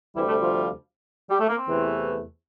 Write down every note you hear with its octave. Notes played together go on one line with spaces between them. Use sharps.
D2 C3 E3 G3 E4
A3 A4
F3 F4
G3 G4
A3 A4
A#3
C4
E2 C3 E3 A3